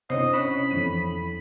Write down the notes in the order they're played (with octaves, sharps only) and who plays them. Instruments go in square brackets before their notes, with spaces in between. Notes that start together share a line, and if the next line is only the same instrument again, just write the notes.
[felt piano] C3 D4 E4 [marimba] C5 C#5 [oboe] D#5
[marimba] C#4 C#5 [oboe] B5
[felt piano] F2 E3 D#7